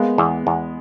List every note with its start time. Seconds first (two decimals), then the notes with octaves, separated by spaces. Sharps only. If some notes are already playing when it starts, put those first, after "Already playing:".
Already playing: G#3 A#3 B3
0.18 E2
0.47 E2